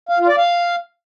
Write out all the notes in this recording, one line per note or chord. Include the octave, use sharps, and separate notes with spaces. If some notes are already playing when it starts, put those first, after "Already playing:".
F5
F4
D5
F5